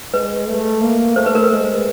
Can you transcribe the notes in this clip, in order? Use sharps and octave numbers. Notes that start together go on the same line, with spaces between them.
G#3 B4
A3
A#3
A3 C5
B4
A#4
B4
G#3